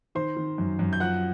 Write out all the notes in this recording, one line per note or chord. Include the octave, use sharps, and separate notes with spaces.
D#3 C5 C6
D#3
F#2
F#2
G6
F3 F#5 F#6